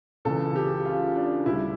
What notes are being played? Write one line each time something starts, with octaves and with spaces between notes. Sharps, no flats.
C#2 C#3 E3 A4
G4
F4
D4
D2 C#3 G3 E4